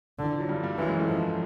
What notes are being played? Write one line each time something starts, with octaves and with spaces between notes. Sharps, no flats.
D3
E3
F3
F#3
G2 G3
G2 G3
F#2 E3 F#3
G#2 G#3
A2 A3
F3